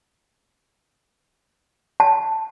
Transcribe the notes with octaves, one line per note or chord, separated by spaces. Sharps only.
A5